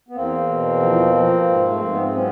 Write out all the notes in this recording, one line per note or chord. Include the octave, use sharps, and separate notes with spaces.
B3
E2 A#3 C4
B2
F3
F3
G#2
A3
G#2 A#3
B3
C4
F#3 B3 C#4